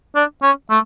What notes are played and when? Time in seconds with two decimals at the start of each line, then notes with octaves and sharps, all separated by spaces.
0.15 D4
0.42 C#4
0.70 A3